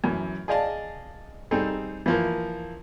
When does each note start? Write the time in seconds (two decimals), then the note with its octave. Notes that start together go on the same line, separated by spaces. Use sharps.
0.04 F#2 E3
0.48 G#4 D5 D#5 F5 A5
1.51 G3 C4 D#4 G#4 A4
2.06 E3 F3 A#3